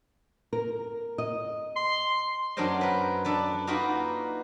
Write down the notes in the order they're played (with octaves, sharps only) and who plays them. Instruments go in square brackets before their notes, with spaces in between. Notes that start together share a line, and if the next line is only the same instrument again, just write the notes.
[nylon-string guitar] A#4
D#5
[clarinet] C6
[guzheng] F#2 F#3 D4 A#4 C5 D#5
A#4 B4
D4 A4 B4
A#3 D#4 F4 F#4 A#4 B4